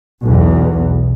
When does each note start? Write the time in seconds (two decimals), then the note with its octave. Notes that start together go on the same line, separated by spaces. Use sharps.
0.23 B1 E2